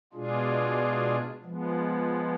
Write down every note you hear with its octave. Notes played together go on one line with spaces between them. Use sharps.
B2 G#3 D4 F4 G#4
F3 G#3 B3